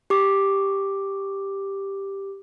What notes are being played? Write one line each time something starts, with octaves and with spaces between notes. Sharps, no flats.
G4 D6